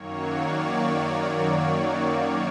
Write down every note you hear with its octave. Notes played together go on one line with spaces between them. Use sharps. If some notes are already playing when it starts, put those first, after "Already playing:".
Already playing: F#2 D#3 F#3 A#3 C#5
D5